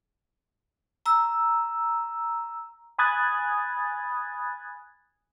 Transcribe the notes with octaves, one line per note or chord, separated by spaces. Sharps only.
A#5 E6
G#5 B5 D#6 F#6 G#6 A6